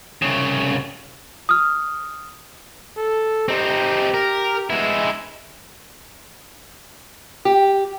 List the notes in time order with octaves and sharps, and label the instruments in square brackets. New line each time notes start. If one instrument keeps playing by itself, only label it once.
[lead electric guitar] C2 C#3
[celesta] D#6 F6
[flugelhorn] A4
[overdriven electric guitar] C4 D#4 [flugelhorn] G4
[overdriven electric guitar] A#4
[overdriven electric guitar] G#3 E4 [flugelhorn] B3
[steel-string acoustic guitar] G4